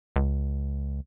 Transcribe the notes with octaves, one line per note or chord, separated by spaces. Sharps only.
C#2